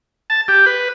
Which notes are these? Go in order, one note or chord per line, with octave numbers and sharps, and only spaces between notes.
A5
G4
B4